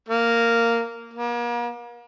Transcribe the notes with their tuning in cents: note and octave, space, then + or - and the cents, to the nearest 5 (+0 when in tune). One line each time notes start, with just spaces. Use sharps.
A#3 -10
A#3 +40